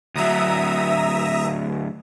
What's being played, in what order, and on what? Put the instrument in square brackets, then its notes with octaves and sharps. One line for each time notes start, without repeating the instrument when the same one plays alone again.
[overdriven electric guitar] D2 F#3 [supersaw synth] E5 A#5 D#6